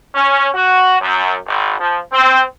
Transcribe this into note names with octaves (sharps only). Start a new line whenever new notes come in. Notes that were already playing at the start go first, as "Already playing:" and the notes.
C#4
F#4
F#2
G#1
F3
C4